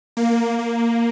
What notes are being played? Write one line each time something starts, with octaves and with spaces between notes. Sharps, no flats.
A#3
A#3